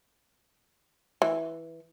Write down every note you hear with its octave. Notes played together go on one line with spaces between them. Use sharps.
E3